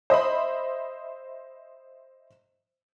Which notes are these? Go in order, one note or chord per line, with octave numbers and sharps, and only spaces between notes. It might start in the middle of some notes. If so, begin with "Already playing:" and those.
C5 D#5 E5 B5